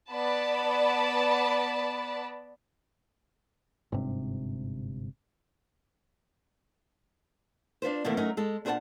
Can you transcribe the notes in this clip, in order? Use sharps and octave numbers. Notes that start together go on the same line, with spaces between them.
B3 D5 A5 B5
G1 G#2 C3
D4 F4 B4 C5
B2 D#3 E3 A3 A#3 E4
F#3 A3 C#4 D#4 A#4
G#3 A4
A#2 D4 G#4 C5 F#5 A5